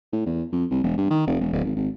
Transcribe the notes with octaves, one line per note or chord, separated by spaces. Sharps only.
A2
E2
F2
C2
E1
G2
D#3
F1
E1
D1
G#1
G#1